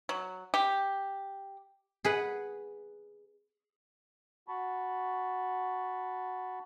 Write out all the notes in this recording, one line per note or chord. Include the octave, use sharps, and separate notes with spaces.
F#3
G4
G#4 B4 F#5
F#4 A5 B5 C#6